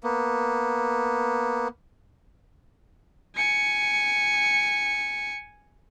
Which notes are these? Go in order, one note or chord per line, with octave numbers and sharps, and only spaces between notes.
A#3 B3
G#5 C#7